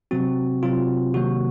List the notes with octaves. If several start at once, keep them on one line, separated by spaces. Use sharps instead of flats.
C3 F#3 C4 F#4
C3 F#3 C4 F4
C3 D#3 F#3 A#3 F#4